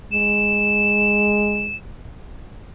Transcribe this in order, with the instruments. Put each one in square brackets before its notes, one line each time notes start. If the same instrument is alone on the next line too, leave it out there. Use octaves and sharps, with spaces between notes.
[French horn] G#3 [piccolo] E7